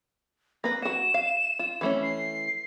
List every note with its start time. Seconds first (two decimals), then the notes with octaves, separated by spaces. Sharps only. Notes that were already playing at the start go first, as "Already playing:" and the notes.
0.64 A#3 B4 A#6
0.82 F#4 F#5 E7
1.14 F5
1.59 F4
1.81 E3 A3 C#4
2.03 C7